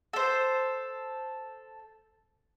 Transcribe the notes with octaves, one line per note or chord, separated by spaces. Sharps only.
A4 C5